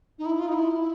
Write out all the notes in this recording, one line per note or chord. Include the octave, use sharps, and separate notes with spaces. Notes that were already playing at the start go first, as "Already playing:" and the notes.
D#4
E4
F4
D#4
E4